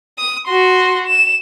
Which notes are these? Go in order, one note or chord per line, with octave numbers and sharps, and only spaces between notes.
D#6
F#4 C6
E7